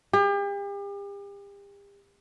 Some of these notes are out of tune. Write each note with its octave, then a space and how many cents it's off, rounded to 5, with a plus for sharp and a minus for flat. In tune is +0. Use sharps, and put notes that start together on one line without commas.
G4 +40